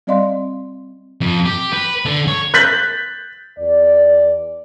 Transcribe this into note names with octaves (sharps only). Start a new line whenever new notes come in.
G3 C4 D5 D#5 F5 C6
F2
G4
B4
D3
C#5
F#6 G6 A6 B6 F#7
E2 D5